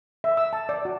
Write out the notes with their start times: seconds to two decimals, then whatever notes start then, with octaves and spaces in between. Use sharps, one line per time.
0.24 E5
0.37 E6
0.53 A5
0.69 D5
0.85 F#4